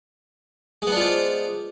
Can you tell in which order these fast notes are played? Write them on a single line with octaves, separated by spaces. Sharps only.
G#3 B3 D4 F4 C5